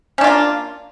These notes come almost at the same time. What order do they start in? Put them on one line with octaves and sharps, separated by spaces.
C#4 D4 F4 A#3